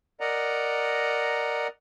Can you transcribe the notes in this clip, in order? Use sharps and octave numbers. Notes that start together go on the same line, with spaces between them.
A#4 D5 D#5 F#5 A#5